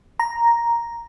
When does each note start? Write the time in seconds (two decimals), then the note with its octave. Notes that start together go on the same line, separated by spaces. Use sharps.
0.20 A#5